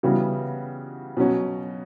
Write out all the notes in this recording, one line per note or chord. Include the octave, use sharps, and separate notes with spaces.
C#3 E3 G3 B3 F#4
B2 F#3 C#4 F#4